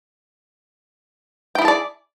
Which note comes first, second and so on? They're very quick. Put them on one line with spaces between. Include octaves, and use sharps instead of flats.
G5 E4 G#4 A5 D5